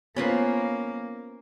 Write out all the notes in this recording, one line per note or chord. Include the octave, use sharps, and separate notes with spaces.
A#3 B3 C#4 F4 B4 C5 G#5